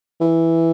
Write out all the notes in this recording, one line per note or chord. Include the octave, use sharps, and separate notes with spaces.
E3